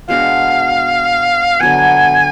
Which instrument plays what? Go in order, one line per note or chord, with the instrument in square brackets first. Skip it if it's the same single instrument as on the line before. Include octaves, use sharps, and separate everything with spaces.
[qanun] B2 G#3 D4 F#4 [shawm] F5
[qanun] D3 F#3 B3 [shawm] G#5